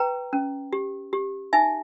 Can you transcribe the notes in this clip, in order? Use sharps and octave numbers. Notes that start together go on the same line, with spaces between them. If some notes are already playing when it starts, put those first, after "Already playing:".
Already playing: B4 G5 A#5
C#4
G4
G4
D#4 E5 G#5